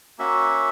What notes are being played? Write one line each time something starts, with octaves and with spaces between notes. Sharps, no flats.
A#3 C#4 F#4 E5